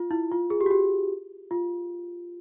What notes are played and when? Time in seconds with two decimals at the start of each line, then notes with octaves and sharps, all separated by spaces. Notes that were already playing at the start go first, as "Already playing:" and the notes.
Already playing: F4
0.11 E4
0.31 F4
0.50 G#4
0.61 G4
0.66 F#4
0.71 G4
1.51 F4